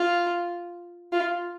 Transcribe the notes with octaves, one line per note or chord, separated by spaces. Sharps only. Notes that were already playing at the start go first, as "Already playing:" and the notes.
Already playing: F4
F4